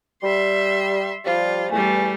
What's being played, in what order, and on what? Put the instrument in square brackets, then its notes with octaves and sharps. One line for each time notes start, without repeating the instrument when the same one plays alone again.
[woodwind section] G3 [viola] E5 C6
[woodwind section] F3 G3 [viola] F4
[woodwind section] E2 G#5 [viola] G3 A3